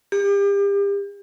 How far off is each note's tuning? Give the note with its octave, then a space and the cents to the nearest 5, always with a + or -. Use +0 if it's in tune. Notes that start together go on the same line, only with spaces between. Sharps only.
G4 +35